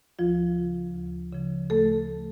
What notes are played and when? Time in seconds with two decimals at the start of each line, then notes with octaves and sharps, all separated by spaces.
0.19 D2 F3 F4
0.57 C#3 F3
0.94 D2
1.32 C#3 F3
1.70 D2 A3 A4